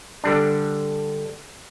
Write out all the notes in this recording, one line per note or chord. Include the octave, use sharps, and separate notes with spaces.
D3 G3 D4